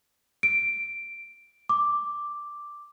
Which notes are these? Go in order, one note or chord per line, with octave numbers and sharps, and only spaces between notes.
D7
D6